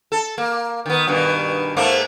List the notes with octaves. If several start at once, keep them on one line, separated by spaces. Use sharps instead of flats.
A4
A#3
D#3 B3
G2 B2 D#3
G#2 A3 A#3